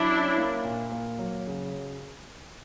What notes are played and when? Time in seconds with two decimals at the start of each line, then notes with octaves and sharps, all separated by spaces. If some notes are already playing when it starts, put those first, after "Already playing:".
Already playing: F#3 D4 E4
0.09 C#4
0.37 A#3
0.64 A#2
0.92 A#3
1.19 F#3
1.47 C#3